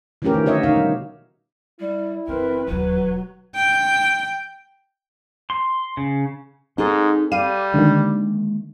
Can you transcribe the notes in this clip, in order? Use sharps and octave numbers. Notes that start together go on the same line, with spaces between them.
E3 F3 A3 C#4 G4 A#4
D#3
D3 F#4 C#5 D#5 E5
B2 D#4 F5
G3
G3 E4
F#1 E3 C4 A#4 B4
E1 D#2 F#3 B4
G5
C6
C#3
G#2 C4 D#4 G#4 A4
G3 F5 D#7
D3 D#3 G#3 A#3